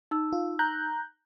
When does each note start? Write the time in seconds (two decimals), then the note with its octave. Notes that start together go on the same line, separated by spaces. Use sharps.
0.11 D#4 E6
0.33 F4
0.59 A#5 F#6 G6